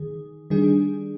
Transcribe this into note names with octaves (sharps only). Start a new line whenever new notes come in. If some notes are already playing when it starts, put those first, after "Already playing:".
Already playing: D#3 G#4
D#3 G3 D4 G#4